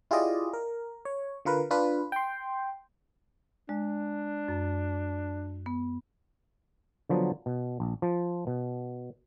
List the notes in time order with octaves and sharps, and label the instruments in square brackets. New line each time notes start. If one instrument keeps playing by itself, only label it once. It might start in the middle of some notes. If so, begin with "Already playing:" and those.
[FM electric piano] E4 F4 G4 G#4 D5 D#5
A#4
C#5
D3 F4 A#4 B4
D4 F4 B4
G5 C6
[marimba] G#3 [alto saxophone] D4
[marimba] F#2
B3
[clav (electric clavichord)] D3 F3 F#3 B3
B2
A#1
F3
B2